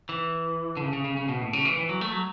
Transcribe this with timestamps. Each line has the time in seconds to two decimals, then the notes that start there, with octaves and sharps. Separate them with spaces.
0.09 E3
0.77 D3
0.81 C#3
0.93 C#3
1.05 C#3
1.17 C#3
1.28 B2
1.41 A2
1.53 C#3
1.65 E3
1.77 E3
1.89 F#3
2.01 A3
2.12 F#3